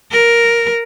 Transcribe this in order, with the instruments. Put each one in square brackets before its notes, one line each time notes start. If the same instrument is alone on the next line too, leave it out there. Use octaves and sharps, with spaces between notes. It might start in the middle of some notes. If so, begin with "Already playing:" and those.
[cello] A#4